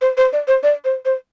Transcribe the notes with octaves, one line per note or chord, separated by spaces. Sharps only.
C5
C5
D5
C5
D5
C5
C5